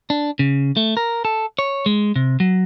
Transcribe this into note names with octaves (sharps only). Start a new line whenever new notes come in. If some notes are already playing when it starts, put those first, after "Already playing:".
D4
C#3
A3
A#4
A4
C#5
G#3
C3
F#3